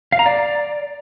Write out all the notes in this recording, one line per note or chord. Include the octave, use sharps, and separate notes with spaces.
F5
A#5
D5